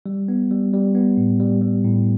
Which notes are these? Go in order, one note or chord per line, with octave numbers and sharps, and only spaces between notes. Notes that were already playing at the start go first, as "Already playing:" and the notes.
G3
B3
G3
G3
B3
A2
G3
G3
A2